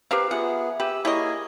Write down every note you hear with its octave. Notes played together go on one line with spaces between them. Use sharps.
C4 G4 A#4 B4 F5
B3 F4 G#4 E5 F#5
G4 B4 E6
A#3 E4 G#4 C#5 D#5 G#5